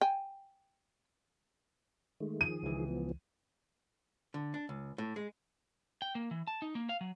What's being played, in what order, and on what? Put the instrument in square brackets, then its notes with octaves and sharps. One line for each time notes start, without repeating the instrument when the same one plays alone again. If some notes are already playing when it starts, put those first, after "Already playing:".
[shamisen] G5 G#5
[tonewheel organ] D#3 G#3 A3
[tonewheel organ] D#3 F3 G#4 [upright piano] D#7
[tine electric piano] C#2 E3
[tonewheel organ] F3 B3
[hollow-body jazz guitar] D3
D4
C#2
A2
G#3
[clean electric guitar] G5
A#3
E3
A5
D#4
A#3
F5
F#3